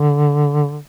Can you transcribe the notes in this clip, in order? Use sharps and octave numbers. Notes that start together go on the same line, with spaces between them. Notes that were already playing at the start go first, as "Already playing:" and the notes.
Already playing: D3